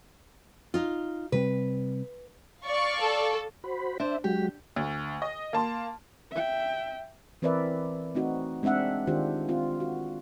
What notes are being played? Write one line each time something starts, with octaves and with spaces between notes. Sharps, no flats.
D#4 F4
C3 G3 C4 B4
D5 F5 C#6
A4
F#4 C5 B5
D4 C5 E5
F#3 G#3 F#4 G4
D2
D#5
A#3 A5 C6
E5 G5
E3 C4 A#4 B4 D5 E5
A3 C4 D#4 F#4
G#3 C4 D4 E5 F#5
D#3 D4 F4 G4 C5
C4 F4
F#4